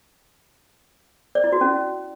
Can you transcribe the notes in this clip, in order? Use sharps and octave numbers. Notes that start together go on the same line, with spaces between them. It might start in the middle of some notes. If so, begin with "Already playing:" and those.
D5
E4
F#4
C#4